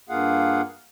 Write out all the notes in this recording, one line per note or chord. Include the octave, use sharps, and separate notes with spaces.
G2 A#3 F4 G#4 F5 F#5